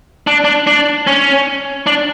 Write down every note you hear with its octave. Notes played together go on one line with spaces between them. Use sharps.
D4
D4
D4
C#4
D4